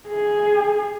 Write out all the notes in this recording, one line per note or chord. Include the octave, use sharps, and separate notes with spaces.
G#4